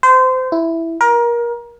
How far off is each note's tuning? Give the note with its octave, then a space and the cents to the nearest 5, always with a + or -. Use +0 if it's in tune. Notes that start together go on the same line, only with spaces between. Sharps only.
C5 -25
E4 +0
A#4 +25